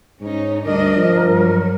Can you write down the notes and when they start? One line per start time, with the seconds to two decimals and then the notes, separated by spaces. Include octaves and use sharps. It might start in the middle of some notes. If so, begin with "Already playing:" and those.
0.20 G#2 C#4 D#4
0.65 D2 G2 D4 A#4 D#5
0.96 F3
1.29 G2 F#3